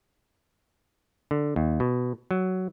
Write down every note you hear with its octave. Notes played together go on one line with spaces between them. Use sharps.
D3
D#2
B2
F#3